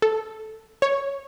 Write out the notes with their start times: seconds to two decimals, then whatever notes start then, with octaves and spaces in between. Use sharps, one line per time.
0.02 A4
0.82 C#5